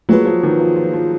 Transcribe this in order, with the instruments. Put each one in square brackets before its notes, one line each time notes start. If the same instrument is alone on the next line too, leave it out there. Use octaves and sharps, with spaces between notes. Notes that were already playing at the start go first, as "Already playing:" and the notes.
[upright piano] F#3 [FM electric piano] A#3 F4 G#4 B4
[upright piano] F3
D#3
F3
F3
F3